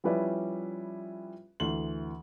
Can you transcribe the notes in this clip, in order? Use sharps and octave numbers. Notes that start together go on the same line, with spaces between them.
F3 G3 C#4 E4 B4 D5
D2 E3 C6 F#7